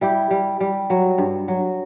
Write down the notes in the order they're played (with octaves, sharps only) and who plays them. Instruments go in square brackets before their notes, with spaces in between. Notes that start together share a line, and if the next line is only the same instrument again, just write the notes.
[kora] G3 E4 G4
G3
G3
F#3
G2
F#3